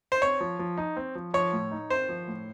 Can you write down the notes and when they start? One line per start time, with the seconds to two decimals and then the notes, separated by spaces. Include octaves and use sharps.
0.12 C5
0.22 C4 C#5
0.40 F3
0.59 F3
0.78 D#4
0.97 C4
1.15 F3
1.34 F3 C#5
1.53 A2
1.71 D#4
1.90 C4 C5
2.09 F3
2.28 A2